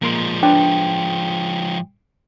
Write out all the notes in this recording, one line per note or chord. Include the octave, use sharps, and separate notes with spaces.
A#2 F3 G#3 A#4 C6
D4 B4 C#5 G5